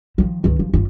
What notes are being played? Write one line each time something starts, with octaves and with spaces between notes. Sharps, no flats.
D#3 F3
C#2 D#3
F3
F#1 F4